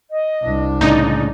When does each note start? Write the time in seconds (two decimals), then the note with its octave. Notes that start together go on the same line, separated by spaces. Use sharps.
0.11 D#5
0.43 C2 D4
0.81 A2 C#3 G#3 D#4 D5